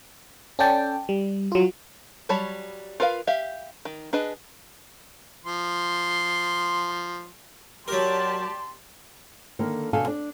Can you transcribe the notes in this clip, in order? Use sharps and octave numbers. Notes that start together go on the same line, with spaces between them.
C#4 A4 D5 G5 A5
G3
F#3 F4
F#3 G3 C#5 A5 B5
F4 A#4 B4 C#5 F5
G4 E5 F5
D#3
D4 G#4 B4 D#5
F3 C6
F#3 G4 A#4 D5 A5 C6
D3 D#3 A#3 A4
B2 D3 A4 F5 G#5
D4